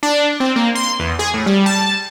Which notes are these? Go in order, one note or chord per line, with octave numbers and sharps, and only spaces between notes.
D4
C4
A#3
C6
E2
G#4
A2
G3
A5